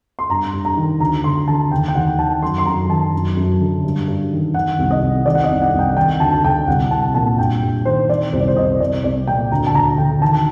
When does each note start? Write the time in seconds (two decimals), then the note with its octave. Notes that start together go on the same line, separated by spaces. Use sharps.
0.19 C6
0.29 G2 A#5
0.53 G2
0.65 A#5
0.77 D#3
1.00 D2 A#5
1.24 D2 C6
1.48 D3 A5
1.71 D#2 G5
1.88 G5
1.95 D#2 F#5
2.19 D#3 A5
2.42 F#2 C6
2.58 C6
2.66 F#2 A#5
2.89 D#3 A5
3.13 F#2
3.37 F#2
3.61 D3
3.84 G2
4.08 G2
4.32 D#3
4.54 D#3 F#5
4.79 C2
4.91 D#5
5.02 C2
5.26 D#3 D5
5.35 F#5
5.44 D#5
5.50 C2
5.62 F#5
5.73 C2
5.79 G5
5.90 F#5
5.97 D#3 G5
6.20 D2 A5
6.34 A5
6.44 D2 G5
6.67 C2 F#5
6.91 C2 A5
7.14 A#2 A5
7.38 G2 G5
7.62 G2
7.85 D#3 C5
8.09 D#3 D5
8.33 C2 C5
8.40 D5
8.48 C5
8.56 C2 D#5
8.72 C5
8.80 C2 D5
9.04 C2 D5
9.27 A#2 G5
9.51 D2 A#5
9.67 A5
9.75 D2 A#5
9.98 D3 G5
10.22 D#3 A5